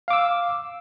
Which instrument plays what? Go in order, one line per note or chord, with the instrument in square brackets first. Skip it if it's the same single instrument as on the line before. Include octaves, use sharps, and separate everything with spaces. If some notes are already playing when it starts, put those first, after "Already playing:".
[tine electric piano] F5
D6
E6